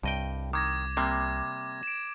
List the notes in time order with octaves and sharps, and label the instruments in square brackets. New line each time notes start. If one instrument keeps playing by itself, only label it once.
[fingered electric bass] C2 [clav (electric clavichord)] G2 D#5 G5
[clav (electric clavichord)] D#3 [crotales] D6 G#6 A#6
[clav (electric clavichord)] C3 G3 A#3
[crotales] D7 E7